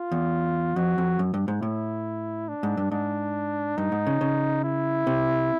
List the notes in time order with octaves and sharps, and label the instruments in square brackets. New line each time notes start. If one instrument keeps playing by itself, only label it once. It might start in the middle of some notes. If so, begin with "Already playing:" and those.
Already playing: [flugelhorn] F4
[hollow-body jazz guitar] E2
[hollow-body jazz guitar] F2 [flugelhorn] F#4
[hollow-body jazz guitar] F2
F#2
G2
G#2
[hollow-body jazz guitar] A2 [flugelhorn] E4
[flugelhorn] D4
[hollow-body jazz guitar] G#2
G2
[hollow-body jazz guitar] G#2 [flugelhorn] D4
[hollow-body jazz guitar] G2 [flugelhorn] D#4
[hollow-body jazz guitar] G#2
C#3
C#3
[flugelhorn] E4
[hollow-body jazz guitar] C3